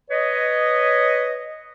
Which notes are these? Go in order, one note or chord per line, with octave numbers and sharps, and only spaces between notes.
B4 C#5 D#5